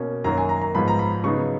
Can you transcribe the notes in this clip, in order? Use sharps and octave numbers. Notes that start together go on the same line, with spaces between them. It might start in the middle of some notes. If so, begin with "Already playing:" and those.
Already playing: B2 A#3 C#4
F#2 D#3 F#3 A#3 A#5
G#5
A#5
A#5
G#2 F3 B3 B5
A#5
B5
C#3 F#3 B3 D#4 C#6